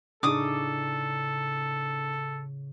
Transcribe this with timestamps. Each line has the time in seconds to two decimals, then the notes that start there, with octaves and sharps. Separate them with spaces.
0.23 A2 C#3 D4 D#4 G#4 A4 D6 D#6